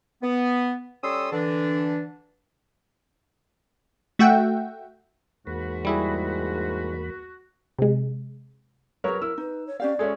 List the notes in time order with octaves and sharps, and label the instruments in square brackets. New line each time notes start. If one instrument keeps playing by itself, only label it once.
[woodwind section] B3
G3 C#4 A4 C6 D#6 E6
D3 E3 D4
[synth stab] A3 F#4 E5 F#5 G5
[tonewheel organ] E2 A#3 B5 [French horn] G#2 [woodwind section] F#4
[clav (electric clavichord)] G3 E4 G#4
[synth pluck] C3 G#3
[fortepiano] F#3 A#4 C#5 [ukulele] G#4 B4
[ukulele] E4 A#4 [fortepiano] E6
[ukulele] D#4 [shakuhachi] B4
[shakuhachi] C#5
[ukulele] C#4 G4 F5 [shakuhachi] D5
[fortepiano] G#3 C#4 [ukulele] F#4 A4 E5